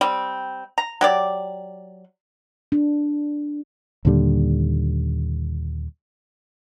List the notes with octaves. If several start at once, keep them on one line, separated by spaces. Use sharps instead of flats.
G3 C4
A#5
F#3 G4 D5
D4
D#2 A#2 D3 G3